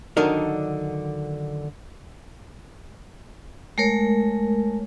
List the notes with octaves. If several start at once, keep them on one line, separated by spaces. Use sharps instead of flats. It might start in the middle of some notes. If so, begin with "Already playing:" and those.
D3 D#3 F#3 D4 D#4 A#4
G#3 A3 A#4 C#5